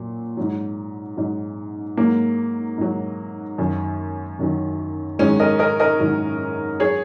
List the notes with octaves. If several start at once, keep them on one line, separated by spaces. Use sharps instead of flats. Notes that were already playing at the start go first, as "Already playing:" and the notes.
Already playing: A#2 F#3
G#2 F#3
G#2 F#3
G#2 F#3 A#3
G#2 F#3
F#2 D#3 F#3
F#2 D#3 F#3
G#2 D#3 F#3 G#3 C#4
A#4 D#5
A#4 D#5
A#4 D#5
G#2 D#3 F#3
F#3 G#4 C#5